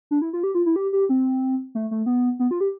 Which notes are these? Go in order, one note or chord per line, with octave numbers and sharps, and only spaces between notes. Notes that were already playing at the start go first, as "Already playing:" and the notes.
D4
E4
F4
G4
F4
E4
G4
G4
C4
A3
A3
B3
B3
F4
G4